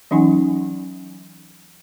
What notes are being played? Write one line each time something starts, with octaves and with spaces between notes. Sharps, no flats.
E3 F#3 C#4 D#4 F#5 G#5